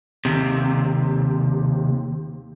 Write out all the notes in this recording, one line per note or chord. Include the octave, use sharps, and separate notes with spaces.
D#2 C3